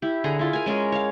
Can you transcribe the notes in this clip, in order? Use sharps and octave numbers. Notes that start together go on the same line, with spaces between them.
E4 G4
D3 G#4 F#5 A#5
E4 F4
A#4 G#5
G#3 C#4 G#4 A#4
C#5 F5